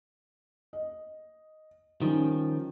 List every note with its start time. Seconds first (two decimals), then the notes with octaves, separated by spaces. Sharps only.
0.73 D#5
2.02 D#3 F3 G3 C#4 D#4